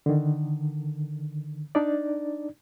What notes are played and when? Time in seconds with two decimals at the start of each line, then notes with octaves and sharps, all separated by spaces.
0.06 D3 D#3
1.75 D4 D#4 D5